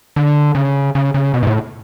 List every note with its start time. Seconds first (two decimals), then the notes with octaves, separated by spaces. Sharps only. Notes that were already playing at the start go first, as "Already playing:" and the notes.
0.16 D3
0.55 C#3
0.95 C#3
1.14 C#3
1.34 B2
1.43 G#2
1.47 A2